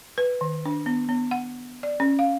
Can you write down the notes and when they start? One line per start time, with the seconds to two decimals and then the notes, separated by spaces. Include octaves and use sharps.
0.18 B4
0.41 D#3
0.65 D4
0.86 B3
1.09 B3
1.31 F#5
1.83 D5
2.00 C#4
2.19 F5